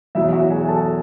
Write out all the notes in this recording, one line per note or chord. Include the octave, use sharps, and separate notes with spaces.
E2 B2 F#3 E4 E5
F#4 F#5
G#4 G#5
A4 A5